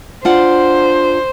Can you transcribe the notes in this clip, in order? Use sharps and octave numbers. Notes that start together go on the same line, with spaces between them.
D4 F4 C5 F#5